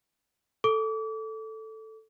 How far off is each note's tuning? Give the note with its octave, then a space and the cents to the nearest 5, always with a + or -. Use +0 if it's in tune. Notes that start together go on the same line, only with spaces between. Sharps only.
A4 +0 D6 -35